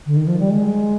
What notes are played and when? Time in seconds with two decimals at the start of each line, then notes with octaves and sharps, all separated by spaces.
0.06 D3
0.17 D#3
0.28 F3
0.39 G3
0.50 G#3